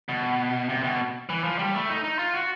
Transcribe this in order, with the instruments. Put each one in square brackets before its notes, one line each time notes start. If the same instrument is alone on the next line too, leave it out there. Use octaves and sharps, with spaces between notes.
[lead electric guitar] B2
C3
B2
E3
F3
G3
A3
D#4
D#4
F4
F#4